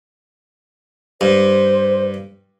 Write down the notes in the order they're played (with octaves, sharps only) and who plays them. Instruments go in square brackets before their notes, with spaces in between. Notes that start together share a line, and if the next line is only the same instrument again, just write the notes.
[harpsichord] G2 [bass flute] C5